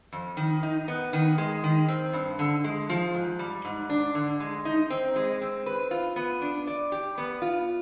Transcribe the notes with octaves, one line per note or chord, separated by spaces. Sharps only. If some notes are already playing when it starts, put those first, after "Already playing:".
F2
D#3
D#4
B3
D#3
G#3
D#3
C4
G2
D3
G#3
F3
G#2
G3
G#2
D4
D3
G#3
D#4
C4
G#3
C4
B4
F4
B3
D4
D5
G4
B3
F4